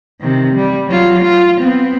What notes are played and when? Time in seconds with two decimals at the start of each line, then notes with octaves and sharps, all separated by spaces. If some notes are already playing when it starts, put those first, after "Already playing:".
0.20 C3 D#3
0.55 G3
0.88 F#3 F4
1.22 F4
1.60 B3 C4